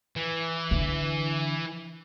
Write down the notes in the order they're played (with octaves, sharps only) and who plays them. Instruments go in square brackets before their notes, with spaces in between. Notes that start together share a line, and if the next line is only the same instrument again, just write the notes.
[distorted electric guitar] E3
[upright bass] D3